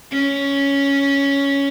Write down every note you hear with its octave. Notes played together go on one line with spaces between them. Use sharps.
C#4